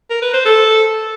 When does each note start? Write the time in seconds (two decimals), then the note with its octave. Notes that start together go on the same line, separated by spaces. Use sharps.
0.10 A#4
0.22 B4
0.34 C5
0.45 A4